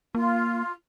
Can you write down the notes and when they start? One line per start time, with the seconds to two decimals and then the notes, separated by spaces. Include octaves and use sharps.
0.15 A#3 F4